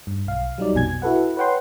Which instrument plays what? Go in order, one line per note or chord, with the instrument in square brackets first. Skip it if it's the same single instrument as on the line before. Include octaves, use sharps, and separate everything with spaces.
[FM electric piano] G2
B1 F5
F#3 G3 D#4 D5
A#1 F2 B2 G#5 G#6
E4 F#4 A4 B4 F#5
B4 C#5 F#5 G5 C6